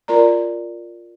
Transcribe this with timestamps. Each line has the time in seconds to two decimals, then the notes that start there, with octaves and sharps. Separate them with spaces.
0.08 F4 A#4 D5 A#5